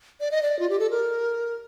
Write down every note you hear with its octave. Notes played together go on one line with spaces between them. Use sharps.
D5
D#5
D5
F4
G4
A4
A#4